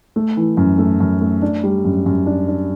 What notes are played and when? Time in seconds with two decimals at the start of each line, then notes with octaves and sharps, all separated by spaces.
0.16 A3
0.37 E3
0.57 F#2
0.78 A3
1.00 F#2
1.21 A3
1.42 D4
1.64 G3
1.85 F#2
2.06 F#2
2.26 D4
2.48 D4